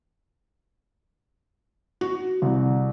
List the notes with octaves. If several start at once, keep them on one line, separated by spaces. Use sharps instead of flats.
F#4
C2